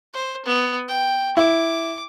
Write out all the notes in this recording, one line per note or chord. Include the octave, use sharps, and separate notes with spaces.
C5
B3
G5
E4 D6